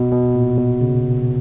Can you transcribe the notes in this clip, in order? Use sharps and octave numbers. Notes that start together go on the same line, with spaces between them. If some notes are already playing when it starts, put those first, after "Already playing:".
Already playing: B2
B2
A#2
B2
C#3